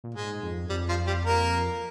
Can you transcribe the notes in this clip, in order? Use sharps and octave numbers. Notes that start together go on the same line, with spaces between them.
A#2
G#2 G#3
F2
F2 G3
F3 F4
G3 G4
A#3 A#4